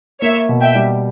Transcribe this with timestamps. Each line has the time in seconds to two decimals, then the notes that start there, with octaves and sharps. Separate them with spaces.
0.21 A#3 C#5 E5
0.49 B2
0.61 E5 G5
0.75 G3